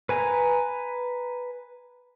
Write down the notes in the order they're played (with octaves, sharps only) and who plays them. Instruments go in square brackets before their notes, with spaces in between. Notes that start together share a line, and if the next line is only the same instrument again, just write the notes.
[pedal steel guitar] B4 G#5 A#5